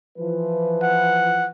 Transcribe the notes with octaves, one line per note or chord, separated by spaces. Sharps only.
E3 F3 B4
F#5